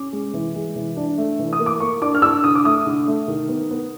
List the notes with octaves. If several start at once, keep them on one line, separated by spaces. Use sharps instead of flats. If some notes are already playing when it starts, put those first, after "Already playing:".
Already playing: C#4 D6
G#3
E3
G#3
E3
D4
A3
E3
D#6
A#3
D6
A#3 C#6
D4 D6
F6
D4 E6
D3 D#6
D6
A3 D#6
D3
A3
D#3
B3
B3